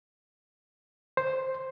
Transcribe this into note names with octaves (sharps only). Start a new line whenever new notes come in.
C5